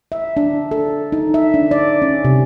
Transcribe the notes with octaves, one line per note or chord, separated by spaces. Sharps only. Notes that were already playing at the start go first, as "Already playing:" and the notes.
E5
D4
A4
D#4
E5
D4
D5
C#4
C3